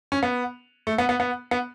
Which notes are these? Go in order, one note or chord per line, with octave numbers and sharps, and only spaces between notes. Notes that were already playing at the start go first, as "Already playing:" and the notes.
C#4
B3
A3
B3
B3
B3
B3